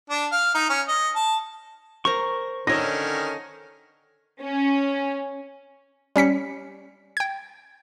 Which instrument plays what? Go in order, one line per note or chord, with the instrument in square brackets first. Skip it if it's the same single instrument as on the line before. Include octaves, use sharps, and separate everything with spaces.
[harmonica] D4
F5
D#4
C#4
D#5
A5
[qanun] A#4 C5 A#5 [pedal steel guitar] C#6
[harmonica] D3 D#3 C#4 [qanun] A4 C#5 D#5 [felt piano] A#6
[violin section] C#4
[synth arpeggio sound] G3 C#4 B6 C#7
G5 G#6